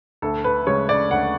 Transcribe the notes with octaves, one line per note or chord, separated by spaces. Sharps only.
D2 A4
B4
C#3 G#3 C#5
D5
D2 F#5